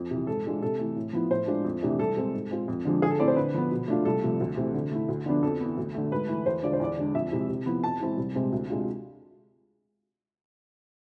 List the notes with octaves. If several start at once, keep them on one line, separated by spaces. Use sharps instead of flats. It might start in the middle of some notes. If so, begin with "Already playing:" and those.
Already playing: F2
C3 E3
G#2 A4
E3 G#3 D4 F4
C3 A4
E3 A3
A2
F3 B3 E4
A2 C5
G#3 D4 F4
F2
C3 E3 A3 D4
C2 A4
C3 G#3 C4
G#2
G#3 C4 F4
F2
D3 F3 G#3 D4
D3 G#4
A4
A3 C4 E4 D5
C5
D3 B4
F3 B3
B2
A3 D4 F4
C2 A4
C3 F3 A3
D2
C3 E3 A3 C4
D3
A3 E4
D2
D3 F3 B3 D4
F2 A4
B3
E3
D2
D3 A3
G#2 B4
E3 A3
E2 C5
D3 G#3 D4 F4 D5
C5
E2 D5
D3 G#3 D4
F2 E5
C3 G#3 C4 E4
C3
F3 B3 E4
F2 A5
E3 G#3 C4 E4
C2
C3 G#3 C4
D2
C3 G#3 D4 F4